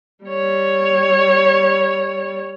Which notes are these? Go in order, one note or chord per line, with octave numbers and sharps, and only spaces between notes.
G3 C#5